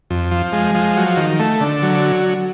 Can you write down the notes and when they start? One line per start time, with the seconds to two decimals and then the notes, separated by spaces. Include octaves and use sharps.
0.10 F2
0.31 F3
0.53 G#3
0.75 F3
0.96 F#3
1.17 D#3
1.40 A3
1.61 D3
1.82 F#3